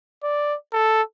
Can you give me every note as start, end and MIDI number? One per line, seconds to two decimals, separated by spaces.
0.23 0.55 74
0.73 1.02 69